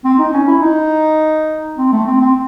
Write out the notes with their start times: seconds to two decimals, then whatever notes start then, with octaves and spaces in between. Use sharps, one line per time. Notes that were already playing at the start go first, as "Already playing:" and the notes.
0.05 C4
0.19 D#4
0.33 C#4
0.48 E4
0.62 D#4
1.78 C4
1.92 A3
2.07 C4
2.21 C4